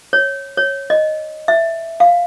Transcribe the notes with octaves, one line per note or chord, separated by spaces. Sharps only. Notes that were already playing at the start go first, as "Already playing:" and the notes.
C#5
C#5
D#5
E5
F5